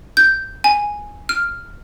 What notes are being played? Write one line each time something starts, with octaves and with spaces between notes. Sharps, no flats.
G6
G#5
F6